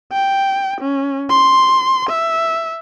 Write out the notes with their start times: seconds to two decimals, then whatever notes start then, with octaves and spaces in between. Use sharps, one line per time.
0.12 G5
0.81 C#4
1.30 C6
2.09 E5